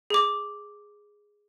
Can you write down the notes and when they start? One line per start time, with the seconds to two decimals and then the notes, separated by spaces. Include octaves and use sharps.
0.10 G#4 D6